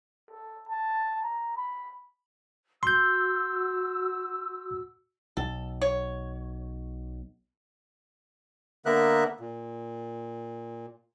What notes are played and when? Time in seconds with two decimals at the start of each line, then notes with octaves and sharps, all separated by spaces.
0.30 A4
0.69 A5
1.23 A#5
1.57 B5
2.83 F#4 C6 E6 G6
5.37 B1 A4
5.82 C#5
8.86 D3 A#3 B3 A#4 E5 F#6
9.40 A#2